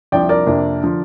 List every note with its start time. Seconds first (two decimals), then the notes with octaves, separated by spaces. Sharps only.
0.12 C2 C3 F3 D4 D5 G5
0.29 A#4 D5
0.47 F2 C3 A#3 D4
0.82 D3 F3